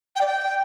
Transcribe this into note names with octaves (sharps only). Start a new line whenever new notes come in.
G5
D5
G5